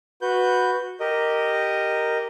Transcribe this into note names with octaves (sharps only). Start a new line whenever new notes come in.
F#4 B4 G6
G4 A#4 D#5